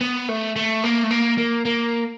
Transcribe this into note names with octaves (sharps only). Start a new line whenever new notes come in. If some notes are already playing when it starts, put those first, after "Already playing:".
B3
A3
A3
A#3
A3
A#3
A#3
A#3